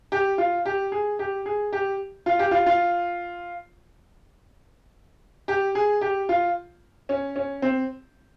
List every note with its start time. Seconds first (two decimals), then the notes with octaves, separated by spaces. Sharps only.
0.12 G4
0.38 F4
0.65 G4
0.92 G#4
1.19 G4
1.46 G#4
1.73 G4
2.26 F4
2.39 G4
2.51 F4
2.66 F4
5.48 G4
5.75 G#4
6.01 G4
6.29 F4
7.09 C#4
7.36 C#4
7.62 C4